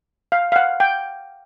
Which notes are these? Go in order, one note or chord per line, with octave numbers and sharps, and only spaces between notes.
F5
F5
F#5
G5